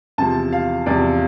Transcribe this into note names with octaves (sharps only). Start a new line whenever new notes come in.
E2 C3 F3 A5
F5
E2 C3 F3 D5